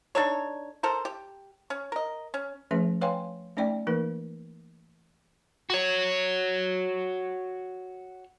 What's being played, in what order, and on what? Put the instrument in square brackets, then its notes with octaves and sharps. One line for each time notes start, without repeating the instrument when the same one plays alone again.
[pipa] D4 D#4 A4 C#5
A4 A#4 C5
G4
C#4
A#4 D#5
C#4
[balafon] F3 A3 C#4 G#4 B4 E5
B4 C#5 F5 G5 G#5 C6
A3 C#4 D#4 D5 E5 G5
E3 A#3 D#4 A#4 B4
[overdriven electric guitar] F#4 C#5